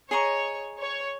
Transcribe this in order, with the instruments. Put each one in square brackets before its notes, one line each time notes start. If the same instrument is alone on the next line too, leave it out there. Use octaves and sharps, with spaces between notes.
[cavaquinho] G#4 D#5 A#5 C#6 [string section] C#5
[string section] C#5